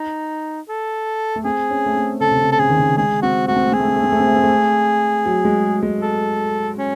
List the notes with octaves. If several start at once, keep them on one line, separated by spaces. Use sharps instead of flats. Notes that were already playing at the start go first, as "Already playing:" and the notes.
Already playing: D#4
A4
A3
C4 G#4
C#4
A3
C4
C#3 A4
C3
C#3
A4
C#3 G#4
D#3
C#3
G#3 G#4
C4 F#4
A3 F#4
C4
A3
C4 G#4
A3
C4
A3
C4
A3
C4
A3
C4
A3
F#3
G#3
G#3
A4
C#4